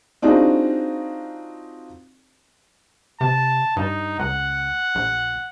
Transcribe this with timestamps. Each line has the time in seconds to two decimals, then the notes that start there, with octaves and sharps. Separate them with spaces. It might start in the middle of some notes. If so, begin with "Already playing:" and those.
0.22 C4 D4 D#4 F4 F#4 G#4
3.21 C3 A5
3.76 G2 D#4
4.19 C#2 F#5
4.95 A#1